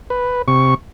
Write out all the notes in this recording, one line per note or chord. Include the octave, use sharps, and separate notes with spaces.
B4
C3 C#6